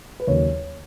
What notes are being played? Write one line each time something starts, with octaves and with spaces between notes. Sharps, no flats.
B4
D#2 C#3 F#3 C#5